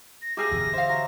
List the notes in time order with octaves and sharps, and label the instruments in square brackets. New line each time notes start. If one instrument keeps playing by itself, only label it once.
[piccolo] A#6
[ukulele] D#4 G#4 G#5 [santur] G4 E5 F5 [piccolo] A#6
[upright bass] D3 E3
[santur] C5 [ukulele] E5 F5
[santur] F#3